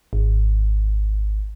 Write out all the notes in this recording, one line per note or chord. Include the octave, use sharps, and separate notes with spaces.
G#1